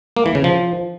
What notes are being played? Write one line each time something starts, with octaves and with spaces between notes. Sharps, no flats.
A#3
E3
C#3
F3